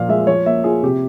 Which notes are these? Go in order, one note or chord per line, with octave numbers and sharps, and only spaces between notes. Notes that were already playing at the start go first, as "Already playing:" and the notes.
Already playing: A#2 F3 A#3 F5
G#3 E5
F3 C#5
A#3 E5
F4 G#4
C3 G4